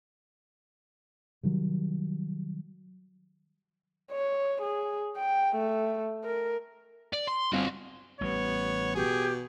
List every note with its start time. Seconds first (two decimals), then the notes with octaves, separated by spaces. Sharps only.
1.43 C3 D#3 F#3 G3
4.11 C#5
4.62 G#4
5.17 G5
5.56 A3
6.25 A#4
7.13 D5
7.27 C6
7.53 G1 C4 F#4 G#4 F5
8.21 A1 G3 B3 C#5
8.95 B2 G4 G#4